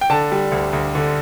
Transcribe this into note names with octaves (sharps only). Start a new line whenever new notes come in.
G5
D3 A5
G3
D2
D2
D3